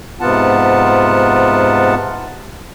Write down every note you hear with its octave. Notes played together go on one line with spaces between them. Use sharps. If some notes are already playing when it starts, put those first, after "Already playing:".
G#2 C3 B3 F4 F#5 A5